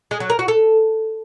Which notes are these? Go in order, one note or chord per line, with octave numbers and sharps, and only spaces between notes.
G#3
F#3
A#4
F#4
A4